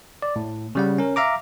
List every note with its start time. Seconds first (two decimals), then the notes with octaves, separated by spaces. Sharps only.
0.22 D5
0.36 A2
0.75 C#3 G3 F#5
0.98 C#4 A#4
1.16 E5 F5 A#5 D6